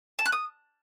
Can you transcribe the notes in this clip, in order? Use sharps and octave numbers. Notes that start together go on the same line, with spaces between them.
A5
F#6
D#6